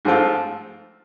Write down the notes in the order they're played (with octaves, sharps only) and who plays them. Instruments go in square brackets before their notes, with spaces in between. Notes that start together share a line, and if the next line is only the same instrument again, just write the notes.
[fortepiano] G#2 F3 A3 C4 F4